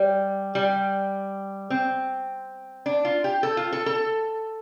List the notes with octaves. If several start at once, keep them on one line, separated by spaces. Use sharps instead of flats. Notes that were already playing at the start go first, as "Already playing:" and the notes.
Already playing: G3
G3
C4
D4
F4
G4
A4
F4
A4
A4